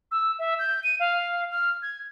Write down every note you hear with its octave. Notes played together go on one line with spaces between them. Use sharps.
E6
E5
G6
D#7
F5
F6
G#6